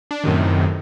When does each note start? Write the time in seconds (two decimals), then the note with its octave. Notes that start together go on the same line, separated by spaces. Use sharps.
0.11 D4
0.24 F#2 A2 C3 D#3